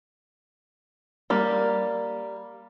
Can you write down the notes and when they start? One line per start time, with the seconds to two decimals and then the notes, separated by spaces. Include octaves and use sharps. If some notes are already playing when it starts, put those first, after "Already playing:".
1.30 G3 A#3